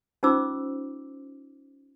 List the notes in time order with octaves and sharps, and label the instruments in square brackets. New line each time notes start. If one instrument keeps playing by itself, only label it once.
[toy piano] C#4 D#4 F4 C5 D6 E6